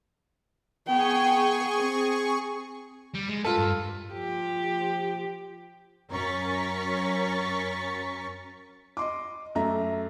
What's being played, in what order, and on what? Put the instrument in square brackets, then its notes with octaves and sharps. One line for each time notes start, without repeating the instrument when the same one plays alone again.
[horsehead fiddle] B3 G5 [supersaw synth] G#4 G#5 C#6
[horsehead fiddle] C4
[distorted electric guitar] G3
G#3
[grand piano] F4 A4 [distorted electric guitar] B4
[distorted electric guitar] G2
[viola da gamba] F3 G4
[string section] F#2 C#4 A#4 C#6 A6 B6
[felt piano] D#5 C6 D6
F#2 A3 E5 A#5